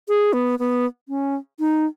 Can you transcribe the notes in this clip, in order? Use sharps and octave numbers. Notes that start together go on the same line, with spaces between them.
G#4
B3
B3
C#4
D#4